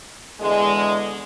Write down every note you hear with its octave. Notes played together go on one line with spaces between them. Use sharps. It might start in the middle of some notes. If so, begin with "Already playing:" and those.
E2 D3 G#3